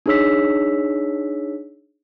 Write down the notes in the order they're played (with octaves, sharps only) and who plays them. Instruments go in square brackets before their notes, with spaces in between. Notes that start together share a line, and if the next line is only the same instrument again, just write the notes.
[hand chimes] D4 D#4 G#4 C#5 E6 B6